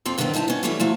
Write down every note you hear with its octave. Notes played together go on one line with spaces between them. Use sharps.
F2 F3 C4
G2 D3 D#3 G#3 B3 C4
G2 D#4 E4 G#5 A5
B3 C#4
E3 F#3 G3 A3 C#4 E4
F3 F#3 A3